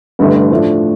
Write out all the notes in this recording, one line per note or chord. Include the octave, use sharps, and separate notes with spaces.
A1 G2 D3 A3
A2 F3 A3 D4